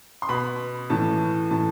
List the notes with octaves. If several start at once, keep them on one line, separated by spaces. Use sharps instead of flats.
C6
B2 B5
A2 E3 A5
A2 E3 A5